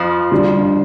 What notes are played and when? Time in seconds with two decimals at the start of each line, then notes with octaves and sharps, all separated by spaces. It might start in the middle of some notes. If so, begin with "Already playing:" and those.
Already playing: F2 F3
0.32 D3 G3 D4